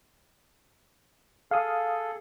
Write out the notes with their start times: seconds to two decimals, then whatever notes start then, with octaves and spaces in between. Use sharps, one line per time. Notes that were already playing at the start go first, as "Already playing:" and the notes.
1.51 G#4 A4 F5 D#6